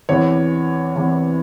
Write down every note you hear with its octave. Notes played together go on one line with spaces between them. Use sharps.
E2 C3 E3 C#5
E2 C3 E3